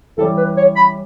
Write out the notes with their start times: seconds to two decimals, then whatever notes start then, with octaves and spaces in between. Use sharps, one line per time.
0.18 E3 G3 C#4 A4
0.37 B4
0.57 C#5
0.76 B5